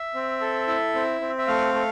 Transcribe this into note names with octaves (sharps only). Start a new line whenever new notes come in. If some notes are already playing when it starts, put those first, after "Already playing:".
Already playing: E5
C4
A4
E4
C4
C4
E5
A3 F5
A3